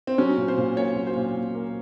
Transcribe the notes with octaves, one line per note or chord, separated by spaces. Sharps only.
C4
F#3 C#4
A#2
C5
A#2
A#3 C#5
F#3
C5
A#2
A#2
A#3